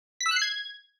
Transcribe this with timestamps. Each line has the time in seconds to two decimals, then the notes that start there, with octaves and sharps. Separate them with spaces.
0.21 B6
0.26 E6
0.31 F#6
0.36 C7
0.42 G#6